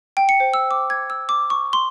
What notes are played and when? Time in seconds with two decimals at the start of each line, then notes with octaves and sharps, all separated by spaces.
0.17 G5
0.29 C#7
0.40 C5
0.54 E6
0.71 D6
0.90 G#6
1.10 E6
1.29 D6
1.50 C#6
1.73 C6